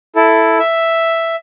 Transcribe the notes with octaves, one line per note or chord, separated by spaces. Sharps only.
E4 A4
E5